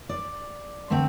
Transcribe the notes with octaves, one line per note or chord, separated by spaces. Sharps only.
D5
D3 A3 C4